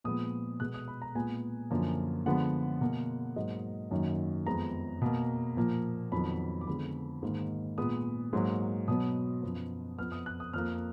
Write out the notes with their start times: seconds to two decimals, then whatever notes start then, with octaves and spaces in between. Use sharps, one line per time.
0.04 A#2 F3 G#3 B3 D#6
0.60 B2 G#3 B3 F#6
0.74 D#6
0.88 B5
1.02 A#5
1.15 A#2 G#3 B3 G#5
1.71 F#2 D3 F3 A#3
2.26 D3 F3 G#3 B3 F#5
2.81 B2 A#3
3.36 G#2 F#3 A#3 D#5
3.91 F#2 D#3 F#3 A#3
4.46 F2 F3 G#3 B3 A#5
5.02 B2 A#3
5.57 A#2 F3 A#3
6.12 F2 D#3 F#3 B3 B5
6.61 D6
6.67 F2 D3 G#3 B3 B5
7.22 G#2 D#3 A#3
7.78 A#2 G#3 B3 D#6
8.33 G#2 F#3 A#3
8.88 B2 F#3 B3 D#6
9.43 F#2 F3 B3
9.99 F2 F3 B3 F6
10.12 D#6
10.26 F#6
10.40 D#6
10.53 F2 F3 A#3 F6